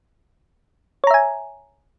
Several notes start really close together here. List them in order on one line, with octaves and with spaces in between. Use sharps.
C#5 A#5 E5 G#5